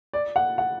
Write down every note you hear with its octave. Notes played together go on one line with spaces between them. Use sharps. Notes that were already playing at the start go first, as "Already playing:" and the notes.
D5
F#5
F#5